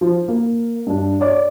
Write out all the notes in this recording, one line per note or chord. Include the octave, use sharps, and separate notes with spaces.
F3
A#3
G2 D4
C#5 D5 D6